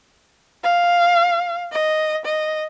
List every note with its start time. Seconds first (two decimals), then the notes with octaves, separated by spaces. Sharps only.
0.64 F5
1.72 D#5
2.25 D#5